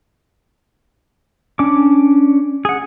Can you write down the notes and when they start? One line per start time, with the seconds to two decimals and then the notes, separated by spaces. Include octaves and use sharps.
1.59 C#4 D4 D6
2.65 G#4 F#5